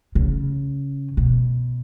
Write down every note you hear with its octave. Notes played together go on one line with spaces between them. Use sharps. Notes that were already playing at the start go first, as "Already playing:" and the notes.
C#3
B2